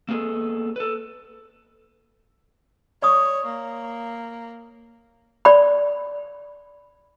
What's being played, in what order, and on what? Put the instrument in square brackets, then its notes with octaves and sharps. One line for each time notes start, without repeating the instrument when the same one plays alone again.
[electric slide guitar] A#3 B3 G#4 A4
A4 B4
[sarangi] C#5 [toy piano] D5 C#6 D#6
[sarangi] A#3
[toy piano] D5 B5